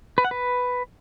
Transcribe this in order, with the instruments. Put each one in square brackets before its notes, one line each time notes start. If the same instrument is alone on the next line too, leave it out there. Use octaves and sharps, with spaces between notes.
[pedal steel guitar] B4
F#5
B4